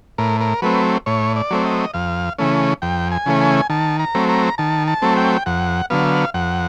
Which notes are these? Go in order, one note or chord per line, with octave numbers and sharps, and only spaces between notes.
A2 A#4
A#4
F#3 A3 C4 B4
A2 C#5
D5
F#3 A3 C4
D#5
F2 F5
C#3 E3 A3 C#4
F2 G5
G#5
C#3 E3 A3 C#4
G#5
D#3 A5
A#5
F#3 A3 C4
A#5
D#3 A5
A5
F#3 A3 C4
G5
F2 F#5
D3 F#3 B3 F5
F2 F#5